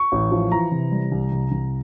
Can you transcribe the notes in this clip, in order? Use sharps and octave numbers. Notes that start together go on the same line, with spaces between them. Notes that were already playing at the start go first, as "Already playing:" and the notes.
Already playing: C#6
A1
F3
E3 A#5
C3
G3
C2
C2
C2